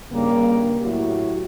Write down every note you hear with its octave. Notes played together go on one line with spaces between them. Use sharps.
G2 C#3 G3 A#3
A2 F#3 E4 F#4 G4